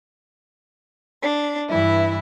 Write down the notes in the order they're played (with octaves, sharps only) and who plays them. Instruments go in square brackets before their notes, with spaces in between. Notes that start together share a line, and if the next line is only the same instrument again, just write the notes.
[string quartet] D4
G2 E3 E4 E5